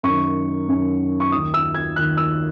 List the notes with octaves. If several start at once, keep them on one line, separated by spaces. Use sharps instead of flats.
F#2 D#3 C#6
F#2 D#3
C#6
D#2 D#3 D#6
E6
G#6
D#2 D#3 F#6
E6